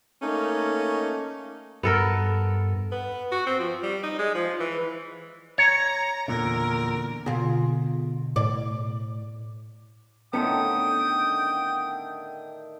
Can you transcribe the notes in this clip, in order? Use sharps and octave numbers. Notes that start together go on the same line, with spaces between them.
A3 A#3 C#4 D#4
G2 B3 A4 A#4
B3
F#4
C4
F3
G3
D#4
G#3
F3
E3
C#5 A#5
E2 A#2 D3 A#4
B2 D3 F4 G#4
A2 D5
A2 D3 D#3 B3 C#4 A4 G5 D#6